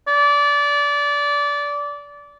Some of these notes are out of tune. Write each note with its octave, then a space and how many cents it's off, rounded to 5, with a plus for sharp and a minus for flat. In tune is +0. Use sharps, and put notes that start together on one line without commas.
D5 -20